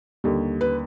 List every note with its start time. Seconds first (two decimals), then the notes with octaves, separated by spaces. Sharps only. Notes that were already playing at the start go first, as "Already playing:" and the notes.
0.24 D#2 D3 G3
0.61 B4